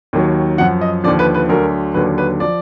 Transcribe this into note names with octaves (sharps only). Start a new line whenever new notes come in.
D#2 D#3 F#3
F#2 F3 F#5
D#5
D#2 D3 F3 D5
B4
B4
D2 D3 F#3 A#4
D#2 D3 F#3 B4
B4
F3 D5